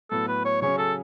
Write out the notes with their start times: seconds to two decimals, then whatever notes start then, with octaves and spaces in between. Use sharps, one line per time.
0.11 A2 F#3 B3 A4
0.28 B4
0.45 C#5
0.62 C#3 F#3 C#4 G#4 C#5
0.78 A4